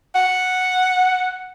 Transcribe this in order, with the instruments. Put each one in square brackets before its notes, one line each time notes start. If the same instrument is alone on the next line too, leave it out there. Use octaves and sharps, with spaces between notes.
[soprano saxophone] F#5